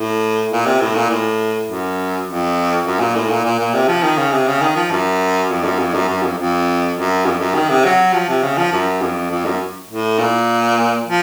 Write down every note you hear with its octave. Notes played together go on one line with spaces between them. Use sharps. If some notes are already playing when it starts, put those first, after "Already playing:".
Already playing: A2
A#2
C3
A2
A#2
A2
F#2
F2
F#2
A#2
A2
A#2
A#2
A#2
C3
F3
D#3
C#3
C3
C#3
D#3
F3
F#2
F2
F#2
F2
F#2
F#2
F2
F2
F#2
F2
F#2
D#3
C3
F#3
F3
C3
C#3
F3
F#2
F2
F2
F#2
A2
A#2
F3